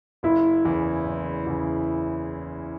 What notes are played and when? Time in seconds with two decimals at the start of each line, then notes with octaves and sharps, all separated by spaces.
0.23 F#1 E4
0.65 E2 C#3
1.06 F#1
1.47 E2 C#3